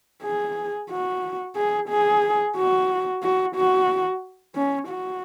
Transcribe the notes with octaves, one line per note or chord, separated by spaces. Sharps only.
G#4
F#4
G#4
G#4
F#4
F#4
F#4
C#4
F#4